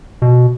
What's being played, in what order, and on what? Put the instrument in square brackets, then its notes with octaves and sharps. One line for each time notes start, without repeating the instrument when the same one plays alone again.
[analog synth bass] B2